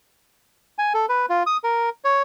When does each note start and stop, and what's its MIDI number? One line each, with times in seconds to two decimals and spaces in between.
0.78 0.93 80
0.94 1.06 69
1.09 1.26 71
1.29 1.43 65
1.46 1.57 87
1.64 1.89 70
2.05 2.22 73